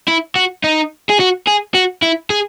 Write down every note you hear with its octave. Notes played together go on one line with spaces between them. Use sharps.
E4
F#4
D#4
G#4
F#4
G#4
F#4
E4
G#4